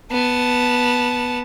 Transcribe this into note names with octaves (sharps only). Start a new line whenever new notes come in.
B3 A5